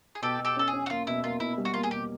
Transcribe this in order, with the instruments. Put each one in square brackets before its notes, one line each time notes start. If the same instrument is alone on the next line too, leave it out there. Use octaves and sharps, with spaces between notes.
[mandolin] G#4
[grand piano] B2 [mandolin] G4 A4
[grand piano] B2
[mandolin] G4 A4
[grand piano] C#4 [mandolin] A4
[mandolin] G#4
[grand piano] C#4
[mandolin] F#4
[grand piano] A#3 [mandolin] F4
[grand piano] B2 [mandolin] E4
[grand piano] A#3 [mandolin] F4
[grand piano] B2 [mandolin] E4
[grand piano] G3
[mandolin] F#4
[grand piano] A#3 [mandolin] F4
[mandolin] G#4
[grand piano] B2 [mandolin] G4